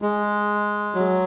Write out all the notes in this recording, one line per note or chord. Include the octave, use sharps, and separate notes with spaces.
G#3
F#3